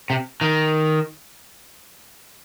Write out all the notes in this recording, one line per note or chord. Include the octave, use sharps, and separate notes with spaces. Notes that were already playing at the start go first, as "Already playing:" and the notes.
C3
D#3